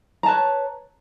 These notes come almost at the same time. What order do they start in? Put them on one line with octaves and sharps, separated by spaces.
A#5 A5 B4 C#5